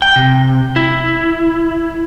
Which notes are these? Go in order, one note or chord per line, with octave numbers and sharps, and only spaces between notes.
G5
C3
E4